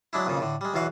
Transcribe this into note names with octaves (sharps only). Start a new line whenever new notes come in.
F#3 G#3 D4 E4
B1 F2 A#2 C#3
A2 D3
G3 G#3
B1 E2 E3 F#4 F5